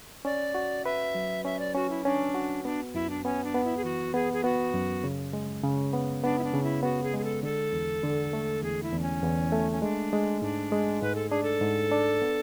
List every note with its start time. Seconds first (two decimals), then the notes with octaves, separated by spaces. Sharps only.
0.25 C#4 D5
0.55 F#4
0.85 B4 E5
1.15 F#3
1.45 C#4 E5
1.59 D5
1.75 C#4 F#4
1.90 E4
2.04 C#4 D4
2.35 F#4
2.65 B3 D4
2.94 F#2 E4
3.10 D4
3.24 B3 C#4
3.44 D4
3.55 B3
3.64 E4
3.77 G#4
3.84 E3 F#4
4.14 B3 G#4
4.33 G#4
4.44 B3 F#4
4.74 F#2
5.04 C#3
5.33 G#3
5.63 C#3
5.93 B3
6.24 B3 D4
6.39 E4
6.44 D4
6.54 C#3
6.63 E4
6.83 B3 F#4
7.03 G#4
7.14 G#3 G#4
7.24 A4
7.43 D3 A4
7.73 E2
8.03 D3
8.33 A3
8.62 E2 G#4
8.83 E4
8.92 E2
8.99 D4
9.02 C#4
9.23 E2
9.52 A3
9.72 C#4
9.82 G#3 D4
10.13 G#3
10.42 G#2 D4
10.72 G#3
11.02 G#2 B4
11.15 A4
11.30 D4 G#4
11.43 A4
11.61 G#2
11.92 D4
12.22 B3